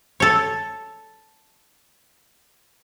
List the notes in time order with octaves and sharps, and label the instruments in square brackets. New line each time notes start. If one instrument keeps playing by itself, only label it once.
[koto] A4 C#5